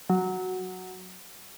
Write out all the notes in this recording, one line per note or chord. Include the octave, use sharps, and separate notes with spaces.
F#3